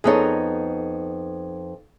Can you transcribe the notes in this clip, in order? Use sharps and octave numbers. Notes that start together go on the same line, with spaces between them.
F2 B3 D#4 G#4 A4 C#5